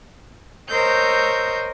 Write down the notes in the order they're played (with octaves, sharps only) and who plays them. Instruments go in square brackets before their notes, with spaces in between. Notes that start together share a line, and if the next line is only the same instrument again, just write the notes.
[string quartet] A#4 C5 C#5 D#5 E6 G6